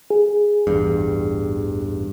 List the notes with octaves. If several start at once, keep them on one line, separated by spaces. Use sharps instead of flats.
G#4
A1 E2 G2